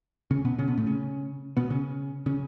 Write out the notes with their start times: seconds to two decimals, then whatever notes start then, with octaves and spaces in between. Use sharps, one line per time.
0.31 C#3 C#4
0.45 B2 B3
0.58 C#3 C#4
0.68 B2 B3
0.77 A2 A3
0.86 C#3 C#4
1.57 B2 B3
1.70 C#3 C#4
2.26 C#3 C#4